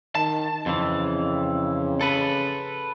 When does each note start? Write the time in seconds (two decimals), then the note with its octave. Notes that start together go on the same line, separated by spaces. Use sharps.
0.15 D#3 A5
0.66 F2 C#3 E3
2.01 A4 B4